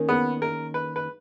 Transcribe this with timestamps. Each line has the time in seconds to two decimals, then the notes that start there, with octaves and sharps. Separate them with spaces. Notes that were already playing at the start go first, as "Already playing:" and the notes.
Already playing: D#3 A#3 C#4 G#4
0.09 B3
0.42 A#4
0.74 B4
0.96 B4